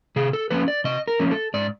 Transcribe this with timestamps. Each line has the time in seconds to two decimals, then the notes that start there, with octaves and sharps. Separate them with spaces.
0.16 C3 G#4
0.33 A4
0.50 F3 A#3 C#4 B4
0.68 D5
0.84 C3 D#5
1.08 A#4
1.20 F3 A#3 C#4
1.31 A4
1.54 G#2 D5